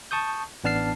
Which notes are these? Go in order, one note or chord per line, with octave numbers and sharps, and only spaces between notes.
A5 C#6 D#6 G6
A1 B3 D4 A5 F6 C7